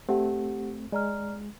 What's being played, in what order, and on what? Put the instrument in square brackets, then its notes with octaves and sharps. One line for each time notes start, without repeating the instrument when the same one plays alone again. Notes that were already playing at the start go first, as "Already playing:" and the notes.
[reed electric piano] A3 C4 [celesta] G4 F#5
[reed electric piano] G#3 [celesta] D5 A#5 F6